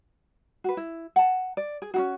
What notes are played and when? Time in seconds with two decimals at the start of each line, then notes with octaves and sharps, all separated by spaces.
0.64 F#4 B4
0.77 E4
1.16 F#5 A5
1.57 D5
1.82 G#4
1.94 C#4 D#4 F#4